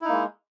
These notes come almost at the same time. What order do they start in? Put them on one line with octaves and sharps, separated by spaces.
E4 D#4 A#3 G#3